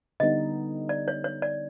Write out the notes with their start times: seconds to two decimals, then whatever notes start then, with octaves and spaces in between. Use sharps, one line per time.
0.20 D3 G3 B3 D#4 D#5
0.89 D5
1.08 C#5
1.24 C#5
1.42 D5